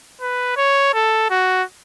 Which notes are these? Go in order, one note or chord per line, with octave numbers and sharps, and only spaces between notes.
B4
C#5
A4
F#4